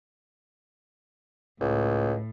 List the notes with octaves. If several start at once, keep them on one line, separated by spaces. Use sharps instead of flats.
C#2 A2